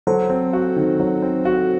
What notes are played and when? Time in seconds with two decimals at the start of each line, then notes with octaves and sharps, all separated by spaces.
0.07 F#3 A4 C5
0.30 C4
0.53 F#4
0.76 D#3
1.00 F#3
1.22 C4
1.45 F#4